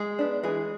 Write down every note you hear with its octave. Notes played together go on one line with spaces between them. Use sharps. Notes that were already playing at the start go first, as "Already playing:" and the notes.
Already playing: G#3 G#4
B3 D4
E3 G#3 G#4